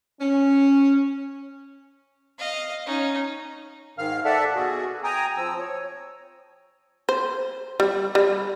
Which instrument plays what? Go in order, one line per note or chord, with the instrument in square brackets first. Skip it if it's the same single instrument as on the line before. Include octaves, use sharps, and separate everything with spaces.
[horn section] C#4
[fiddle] D#5 F5
C#4 D#4
[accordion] G#2 D#3 F5 F6
A4 D5 E5 F#5 A5
B2 F#4 G#4
G5 G#5 A#5 D#6
F3 C4 E6
C#5
[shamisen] C5
G3
G3